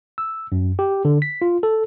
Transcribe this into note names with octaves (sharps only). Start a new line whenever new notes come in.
E6
F#2
G4
D3
B6
F4
A4